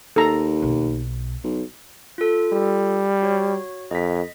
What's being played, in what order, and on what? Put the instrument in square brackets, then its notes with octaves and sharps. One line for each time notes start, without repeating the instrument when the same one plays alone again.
[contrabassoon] D#2 [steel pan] A4 A#5
[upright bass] B1
[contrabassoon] B1
[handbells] F4 A4
[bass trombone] G3
[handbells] F#4 C#5
[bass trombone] F2 [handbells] D#5 B6